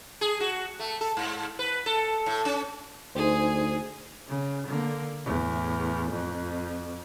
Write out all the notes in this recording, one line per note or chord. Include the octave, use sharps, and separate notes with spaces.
G#4
F#4
A3
A4
G#2
B4
A4
A2
C#4
D2 D#4 G#4 C5
C#3
D3 A#3
E2 A2
F2